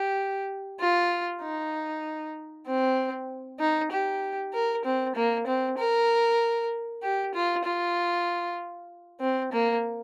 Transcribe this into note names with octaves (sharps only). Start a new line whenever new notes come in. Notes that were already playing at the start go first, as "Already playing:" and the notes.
Already playing: G4
F4
D#4
C4
D#4
G4
A#4
C4
A#3
C4
A#4
G4
F4
F4
C4
A#3